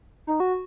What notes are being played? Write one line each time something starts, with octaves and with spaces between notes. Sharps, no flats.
D#4
F#4